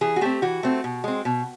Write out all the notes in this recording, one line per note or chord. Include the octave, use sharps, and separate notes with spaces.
E3 G#4
F#4
A3 C4 G4
E3 F#4
A3 C4
B2
G#3 C4
B2